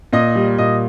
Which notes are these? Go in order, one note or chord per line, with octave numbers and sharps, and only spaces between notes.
A#2 D#5 D#6
G3
A#2 D#5 D#6